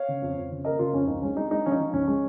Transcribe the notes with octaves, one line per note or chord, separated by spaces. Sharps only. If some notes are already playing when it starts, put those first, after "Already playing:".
Already playing: C#5 F5
C#3
F2
F2
C#3
A#3 A#4 D#5
C#3 F4 A#4
F2 C#4
C#2 D#4
G#3 C#4
G#3 D#4
G#3 D#4
F3 C#4
D#4
F3
C#2 C#4
G#3